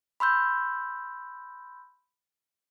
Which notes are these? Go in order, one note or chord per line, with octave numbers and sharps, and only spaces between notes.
B5 C6 E6 G6